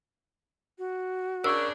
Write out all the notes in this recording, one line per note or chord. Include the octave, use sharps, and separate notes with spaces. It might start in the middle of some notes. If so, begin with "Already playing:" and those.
F#4
C#3 D4 A#4 C#6 E6